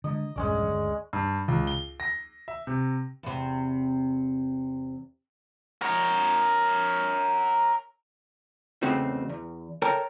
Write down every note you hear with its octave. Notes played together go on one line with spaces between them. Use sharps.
D3 G#3 D#5
A#1 E2 G2 G#3 C#4 D5
G1 D2
G2
C#2
G7
A#6
E5
C3
E2 C3
A#4 C#5
B1 E2 C#3 A3 C4 F#4
E2
A4 A#4 C#5 G5 A5 A#5